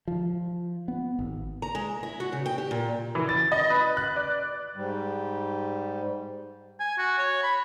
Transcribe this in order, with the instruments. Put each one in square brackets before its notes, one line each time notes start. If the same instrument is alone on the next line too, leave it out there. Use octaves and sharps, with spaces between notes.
[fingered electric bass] F3
B3
G#1
[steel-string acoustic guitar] A#5
G#3
E4
F#4
C#3
G5
G4
A#2
[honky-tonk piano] E3
A6
D#5
B4
F#6
D5
[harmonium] G#2 G3
[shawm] G#5
F#4
C#5
B5